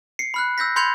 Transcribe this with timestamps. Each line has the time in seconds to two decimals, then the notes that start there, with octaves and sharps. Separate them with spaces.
0.19 C7 C#7
0.34 B5 F6 F#6
0.58 E6 G6 A#6 B6
0.76 B5 C6 G6 G#6 C#7 F7